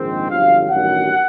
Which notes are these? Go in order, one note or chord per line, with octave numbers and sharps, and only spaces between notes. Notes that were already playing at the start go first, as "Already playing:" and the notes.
Already playing: A#1 G#2 D#3 G#3 C4
G1 F2 D3 F#3 F5
A1 G2 D#3 F#3 F#5